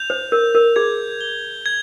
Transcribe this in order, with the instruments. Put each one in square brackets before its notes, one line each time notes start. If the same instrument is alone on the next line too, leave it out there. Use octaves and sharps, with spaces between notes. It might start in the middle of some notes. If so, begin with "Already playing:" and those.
Already playing: [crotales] G6 F7
[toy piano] C5
[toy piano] A#4 [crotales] G6
[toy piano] A#4
[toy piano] G#4 [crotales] G#6
[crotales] G7
G#6